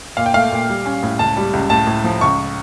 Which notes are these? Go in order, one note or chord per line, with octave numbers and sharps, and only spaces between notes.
A#2 F5
G5
A3 F5
A#2
G3
C#4
A2
C#2 A5
G3
C#2
A2 A5
A2
F3
C#2 C#6